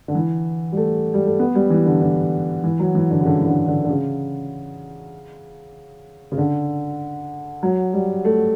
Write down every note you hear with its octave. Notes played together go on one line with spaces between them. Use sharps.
D3
E3
G3
A3
G3
A3
B3
G3
E3
D3
D3
E3
F#3
E3
D3
C#3
D3
E3
D3
D3
D3
C#3
C#3
D3
F#3
G3
A3